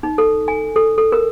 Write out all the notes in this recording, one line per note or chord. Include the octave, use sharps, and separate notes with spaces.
D#4
A4
G#5
A4
A4
A#4